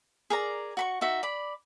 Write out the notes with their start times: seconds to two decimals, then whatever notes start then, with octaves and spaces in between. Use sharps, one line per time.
0.30 G#4 A#4 D5 A#5
0.77 F#4 B5 C#6
1.01 D#4 F#4 E5
1.23 D5 B5